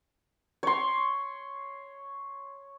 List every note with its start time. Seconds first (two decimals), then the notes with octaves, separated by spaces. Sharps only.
0.63 C#5 C6